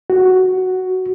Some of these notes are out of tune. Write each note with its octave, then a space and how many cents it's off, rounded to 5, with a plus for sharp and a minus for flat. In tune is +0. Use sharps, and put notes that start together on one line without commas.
F#4 +5